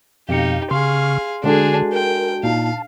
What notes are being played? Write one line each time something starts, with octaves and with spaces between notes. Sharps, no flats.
F2 B2 D#4 G4 F5 C#7
C#3 G#4 F5 C6 C#6 F6
D3 G#3 D4 F#4 G#4 A4
A#4 G5
A#2 D#4 F5 A5